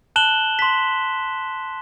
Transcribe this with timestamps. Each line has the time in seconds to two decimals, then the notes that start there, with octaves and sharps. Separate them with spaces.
0.16 A5 F#6 E7 F#7 G7
0.59 C6 B6